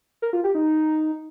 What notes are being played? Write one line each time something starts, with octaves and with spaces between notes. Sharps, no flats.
A#4
F4
G4
D#4